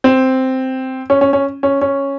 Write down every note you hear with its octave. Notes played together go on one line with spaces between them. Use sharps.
C4
C#4
C#4
C#4
C#4
C#4